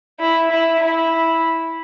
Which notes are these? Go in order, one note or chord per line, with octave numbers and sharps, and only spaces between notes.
E4
E4
E4